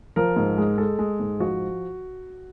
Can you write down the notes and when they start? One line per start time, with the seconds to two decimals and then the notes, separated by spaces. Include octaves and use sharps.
0.16 F3 A#4
0.36 G#2
0.58 G#3
0.78 G#3 A4
0.99 G#3
1.20 G#2
1.40 F3 F#4